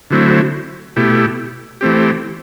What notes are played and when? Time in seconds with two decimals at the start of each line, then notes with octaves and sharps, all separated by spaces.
0.10 D3 F#3 A3 C4 E4
0.96 B2 A3 E4 G4
1.81 E3 A3 C4 G4